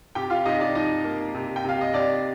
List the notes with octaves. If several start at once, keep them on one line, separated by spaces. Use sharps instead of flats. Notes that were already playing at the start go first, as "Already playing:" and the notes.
C3 G4 G5
F4 F5
C3 D#4 D#5
D4 D5
F3 D#4 D#5
A#3
C3
G5
C3 F5
D#5
C3 D4 D5